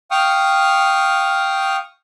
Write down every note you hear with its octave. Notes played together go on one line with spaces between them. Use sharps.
F5 G5 C#6 D#6 F6